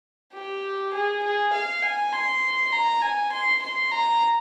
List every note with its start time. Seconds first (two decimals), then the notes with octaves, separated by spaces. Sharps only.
0.33 G4
0.93 G#4
1.23 G#4
1.53 F5
1.82 G#5
2.13 C6
2.72 A#5
3.02 G#5
3.32 C6
3.62 C6
3.91 A#5